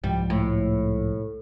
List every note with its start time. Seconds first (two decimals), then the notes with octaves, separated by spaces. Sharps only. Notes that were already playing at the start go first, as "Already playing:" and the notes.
0.04 C2 G#2 F3 G3
0.30 A2